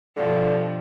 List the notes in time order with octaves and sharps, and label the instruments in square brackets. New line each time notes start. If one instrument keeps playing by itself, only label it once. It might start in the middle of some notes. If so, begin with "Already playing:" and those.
[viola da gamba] G2 B2 F3 [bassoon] D3